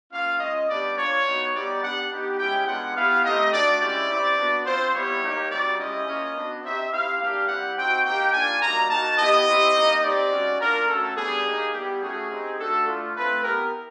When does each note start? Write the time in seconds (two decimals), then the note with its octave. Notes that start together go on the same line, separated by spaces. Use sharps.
0.12 A#3 C#4 F4 F5
0.40 G#3 C#4 F4 D#5
0.69 G3 B3 D4 G4 D5
0.97 A#3 D4 F4 C#5
1.26 B3 D#4 F#4
1.53 G3 B3 D#4 G4 D5
1.82 B3 D4 G4 F#5
2.10 B3 D#4 G4
2.38 G#3 C#4 E4 G4 G5
2.67 G#3 B3 D4 F4 F#5
2.95 B3 E4 G4 F5
3.23 A3 C4 D#4 G4 D#5
3.51 A3 D4 F#4 D5
3.80 G#3 C#4 E4 G4 D5
4.09 C4 E4 G4
4.37 B3 D4 F#4
4.65 C4 F4 C5
4.94 G3 B3 E4 G4 C#5
5.22 A#3 D#4 G4
5.50 G3 C4 D#4 F#4 D5
5.78 G#3 C#4 E4 G4 D#5
6.07 A#3 C#4 F4
6.36 B3 D4 F#4
6.63 C4 D#4 G4 E5
6.91 C4 E4 G4 F5
7.20 G3 A#3 D4 G4 F5
7.48 G3 C4 E4 G4 F#5
7.77 C4 D#4 F#4 G5
8.04 A#3 D#4 G4 G5
8.33 A#3 D4 F4 G#5
8.62 G3 A#3 D#4 F#4 A#5
8.89 A#3 D#4 F#4 A5
9.18 B3 E4 G4 D#5
9.47 C4 E4 G4
9.75 A#3 D#4 G4
10.03 C4 D#4 G4 D5
10.31 G#3 C#4 F#4
10.59 A#3 D4 F4 A#4
10.87 A3 C#4 F#4 A4
11.16 G3 B3 D4 G4 G#4
11.45 A#3 D#4 G4
11.72 G3 B3 E4 G4
12.01 A3 C#4 F#4 G#4
12.30 C4 D#4 G4
12.58 A3 D4 F#4 A4
12.86 A3 D4 F4
13.15 A3 C4 F4 B4
13.43 B3 E4 G4 A#4